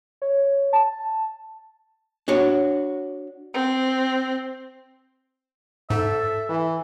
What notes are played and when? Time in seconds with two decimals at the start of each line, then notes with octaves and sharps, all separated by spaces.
0.22 C#5
0.73 A5
2.28 D4 F#4 C#5
3.54 C4
5.90 G#2 A4 E5
6.50 E3